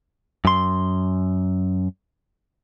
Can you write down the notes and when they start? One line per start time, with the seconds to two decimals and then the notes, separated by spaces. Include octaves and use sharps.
0.45 F#2 C6